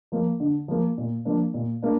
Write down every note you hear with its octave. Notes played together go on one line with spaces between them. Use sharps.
F3 A#3
D3
F3 A#3
A#2
F3 A#3 D4
A#2
A#3 D4